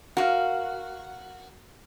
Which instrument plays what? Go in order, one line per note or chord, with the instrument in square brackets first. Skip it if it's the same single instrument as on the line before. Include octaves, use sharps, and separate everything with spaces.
[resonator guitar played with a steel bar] F#4 [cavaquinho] A#4 F5